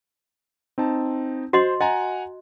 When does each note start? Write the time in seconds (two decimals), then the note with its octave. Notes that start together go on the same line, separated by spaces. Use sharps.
0.78 C4 D#4 A5
1.53 F#4 C5 D#5 C6
1.81 D#5 F#5 G#5 A#5